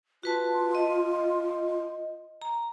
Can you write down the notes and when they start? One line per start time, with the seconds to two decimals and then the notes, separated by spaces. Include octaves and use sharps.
0.23 F4 F#4 B4 A5
0.75 D#5
2.42 A#5